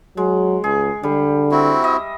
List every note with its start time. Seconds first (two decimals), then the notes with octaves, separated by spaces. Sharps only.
0.17 F#3 G#3
0.64 C#2 G#4
1.03 D3 G3
1.51 C4 E4 F#4
1.82 D#5 E5